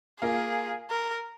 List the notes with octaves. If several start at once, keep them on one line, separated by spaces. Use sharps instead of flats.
A#3 F4 G#4 A#4 F5
A#4